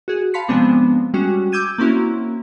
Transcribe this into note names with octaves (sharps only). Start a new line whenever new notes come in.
F#4 G#4
F5 A5 B5 C6 B6 C#7
C3 F3 G#3 B3 C4 D4
G3 G#3 C#4 F#4
D6 E6 G6 G#6 D#7 E7
A#3 C4 C#4 E4 F#4